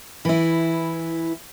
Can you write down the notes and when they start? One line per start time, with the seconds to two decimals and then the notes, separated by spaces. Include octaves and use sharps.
0.25 E3 E4